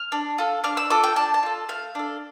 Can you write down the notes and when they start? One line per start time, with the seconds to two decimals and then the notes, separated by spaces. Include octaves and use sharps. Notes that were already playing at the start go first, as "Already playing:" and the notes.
Already playing: F6
0.12 D4
0.38 F4 A4
0.64 D4 F6
0.77 E6
0.90 F4 A4 D6
1.03 G5
1.16 D4 A5
1.34 A5
1.43 F4 A4
1.69 A3 F5
1.95 D4 A4